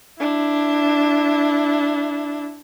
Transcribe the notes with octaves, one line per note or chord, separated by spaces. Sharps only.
D4 E4